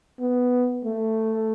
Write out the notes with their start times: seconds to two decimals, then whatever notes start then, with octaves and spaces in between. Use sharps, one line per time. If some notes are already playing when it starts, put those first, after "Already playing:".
0.19 B3
0.85 A3